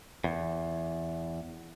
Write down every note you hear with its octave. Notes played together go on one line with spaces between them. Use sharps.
E2